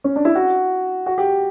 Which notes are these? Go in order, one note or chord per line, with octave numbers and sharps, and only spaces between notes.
C#4
D4
E4
F#4
F#4
G4